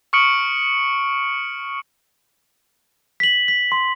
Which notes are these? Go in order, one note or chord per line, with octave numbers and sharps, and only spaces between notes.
C#6 D#6 F6 C#7 D7 F#7
B6 F#7
B6
C6